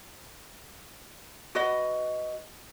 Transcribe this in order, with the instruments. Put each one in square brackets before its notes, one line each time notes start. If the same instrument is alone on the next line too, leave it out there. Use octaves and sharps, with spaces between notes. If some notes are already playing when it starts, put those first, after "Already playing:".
[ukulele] F#4 B4 D#5